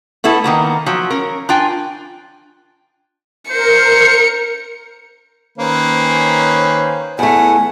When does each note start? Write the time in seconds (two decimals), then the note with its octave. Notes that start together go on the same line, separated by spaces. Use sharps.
0.24 A3 B3 E4 A4
0.44 D#3 A#3 B3
0.86 F3 F#3
1.10 C#4 A#4
1.49 D4 F4 G5 G#5
3.50 A#4 C5 C#7
5.58 D#3 A#3 C#4 B4 C5
7.19 E2 A3 F#5 G#5